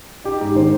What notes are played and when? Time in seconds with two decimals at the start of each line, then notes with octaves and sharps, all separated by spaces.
0.24 D#4 G4
0.41 G#2
0.55 D#3 C5